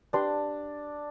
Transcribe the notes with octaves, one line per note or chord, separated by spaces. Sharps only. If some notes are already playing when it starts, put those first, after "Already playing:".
D4 G4 B4 D5 G5 C6